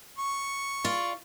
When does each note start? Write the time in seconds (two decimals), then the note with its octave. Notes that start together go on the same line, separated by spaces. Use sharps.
0.18 C#6
0.84 F4 D5